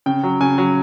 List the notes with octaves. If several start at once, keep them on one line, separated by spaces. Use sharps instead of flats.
C#3 G5
F#3
C#3 G#5
F#3